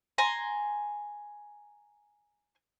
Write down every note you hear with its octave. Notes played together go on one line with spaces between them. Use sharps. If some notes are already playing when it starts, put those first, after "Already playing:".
G#5 A#5 C6